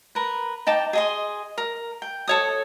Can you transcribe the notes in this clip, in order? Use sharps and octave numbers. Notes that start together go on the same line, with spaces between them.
A#4 B4
D#4 G5 A5 D6
G#4 D#5 C6
A#4
G5
A4 C#5 D#6